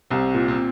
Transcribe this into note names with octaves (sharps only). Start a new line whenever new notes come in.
C2 C4
A#2
C4